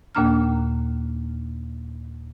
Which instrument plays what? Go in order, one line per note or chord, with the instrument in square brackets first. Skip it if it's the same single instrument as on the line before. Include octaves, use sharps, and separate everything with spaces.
[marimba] D#2 A#2 A#3 D4 A#5 F6